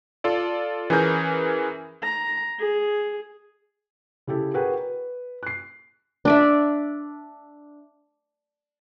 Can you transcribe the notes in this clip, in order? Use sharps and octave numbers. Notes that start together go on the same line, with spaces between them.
F4 A4 D5
E3 C#4 G#4 A#4 G6
A#5
G#4
C#3 E4 G4 A4
F#4 G#4 A#4 B4 F#5 G5
B4
F#6 C7
D4 D5 E5